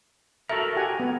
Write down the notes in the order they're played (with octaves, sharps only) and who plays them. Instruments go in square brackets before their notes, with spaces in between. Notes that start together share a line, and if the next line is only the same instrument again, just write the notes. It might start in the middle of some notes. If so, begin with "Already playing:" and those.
[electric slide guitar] F#4 A4 A#4 [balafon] E5
[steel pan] G4 F#5 G#5
B3